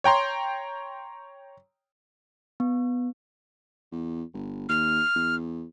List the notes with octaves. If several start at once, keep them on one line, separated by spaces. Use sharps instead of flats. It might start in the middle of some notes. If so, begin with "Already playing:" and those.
C#5 G5 A#5 C6
B3
E2
G1
D#2 F6
E2